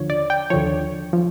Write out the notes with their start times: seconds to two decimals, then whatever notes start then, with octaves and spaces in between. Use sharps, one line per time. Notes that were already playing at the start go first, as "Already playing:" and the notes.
Already playing: D#2 D3 F3 C#5
0.10 D5
0.30 G5
0.50 D#2 D3 F3 C#5
1.13 F3